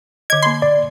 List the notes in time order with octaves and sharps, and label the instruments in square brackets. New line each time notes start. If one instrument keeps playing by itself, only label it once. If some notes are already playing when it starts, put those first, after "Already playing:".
[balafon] D3 D#5 [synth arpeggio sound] G#6
[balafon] A#3 B5 [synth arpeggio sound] C6
[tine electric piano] D5